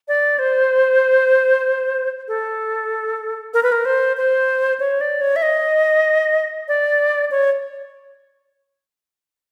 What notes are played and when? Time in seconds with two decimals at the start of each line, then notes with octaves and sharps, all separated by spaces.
0.08 D5
0.39 C5
2.28 A4
3.54 A#4
3.63 B4
3.72 A#4
3.85 C5
4.17 C5
4.80 C#5
5.01 D5
5.21 C#5
5.36 E5
5.42 D#5
6.68 D5
7.31 C#5